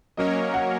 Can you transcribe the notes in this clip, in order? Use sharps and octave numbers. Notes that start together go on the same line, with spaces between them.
F#3 A#3 C#4 A#4 C#5 D#5
F#5